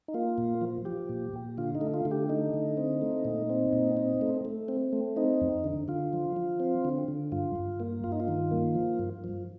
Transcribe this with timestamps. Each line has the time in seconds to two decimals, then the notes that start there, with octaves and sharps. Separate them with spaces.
0.08 D#4
0.14 A#3 F4
0.38 A#2
0.61 F3
0.85 F3 G4
1.09 A#2
1.33 A#2
1.58 D3 F4
1.75 D#4
1.81 A3
1.94 F4
2.05 D3
2.11 G4
2.29 A3 D#4
2.54 D3
2.77 C4
3.02 A3
3.25 A#2
3.50 C4
3.73 A#2
3.97 C4
4.21 A3
4.45 A3
4.68 C4
4.93 A3
5.16 C4 D#4
5.41 F2
5.64 D3
5.88 D3 F4
6.13 F3
6.36 F3
6.60 C4
6.85 D3
7.08 D3
7.32 G2 F4
7.56 G2
7.80 A#3
8.04 G2 F4
8.12 D#4
8.20 F4
8.28 D#3
8.51 A#3
8.75 F3
8.99 G2
9.24 F3